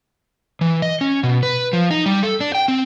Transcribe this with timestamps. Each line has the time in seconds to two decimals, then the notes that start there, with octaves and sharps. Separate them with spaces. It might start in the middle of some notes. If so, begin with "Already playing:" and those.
0.61 E3
0.82 D#5
1.01 C#4
1.23 B2
1.43 B4
1.73 F3
1.91 D#4
2.06 G3
2.23 A4
2.41 D4
2.55 G5
2.68 C4